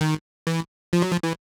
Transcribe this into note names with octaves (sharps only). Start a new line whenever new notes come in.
D#3
E3
F3
F#3
F3
E3